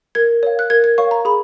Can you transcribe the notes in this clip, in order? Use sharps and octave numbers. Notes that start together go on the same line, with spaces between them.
A#4 G#6
C#5 F5
F#6
A#4 G#6
G#6
C#5 F5 C#6
A#5
G#4 B5